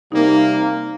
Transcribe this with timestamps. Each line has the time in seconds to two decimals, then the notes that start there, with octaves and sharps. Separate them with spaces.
0.11 C3 G3 A#3 D#4